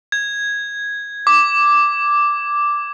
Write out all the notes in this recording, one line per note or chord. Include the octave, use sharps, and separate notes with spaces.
G#6
D6